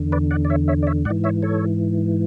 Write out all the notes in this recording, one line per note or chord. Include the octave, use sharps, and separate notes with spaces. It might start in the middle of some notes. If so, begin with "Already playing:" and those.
Already playing: E2 D3
B4 D5
D5 F#5
D5
C#5 E5
C#5 E5
D5
C#5 E5
G#2 D5 F#5
E3
C#5 E5
A4 C#5